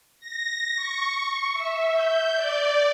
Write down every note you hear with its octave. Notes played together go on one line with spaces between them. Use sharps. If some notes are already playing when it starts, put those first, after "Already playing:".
A#6
C#6
E5
G6
D5